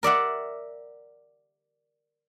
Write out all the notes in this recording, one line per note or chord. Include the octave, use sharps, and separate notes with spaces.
A#4 D5 E5 F#5